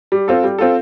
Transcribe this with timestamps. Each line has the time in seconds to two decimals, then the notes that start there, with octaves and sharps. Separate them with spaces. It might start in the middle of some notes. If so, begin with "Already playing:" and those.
0.12 G3
0.28 C4 F4 A4
0.43 G3
0.59 C4 F4 A4